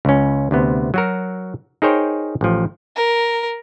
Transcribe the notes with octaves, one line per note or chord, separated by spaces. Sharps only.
C#2 C#4
D2 C3 B3
F#3 F#4 A#4
D#4 G#4 A#4 C5 C#5 G5
A1 F3
A#4